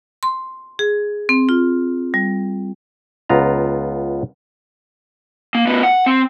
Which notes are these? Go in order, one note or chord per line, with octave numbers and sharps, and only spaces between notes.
C6
G#4
C4
F4
G3
C#2 B3 F4 A#5
A#3
A2 B3
F#5
C4